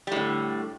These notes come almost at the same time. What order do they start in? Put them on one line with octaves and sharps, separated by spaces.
G3 A2 D3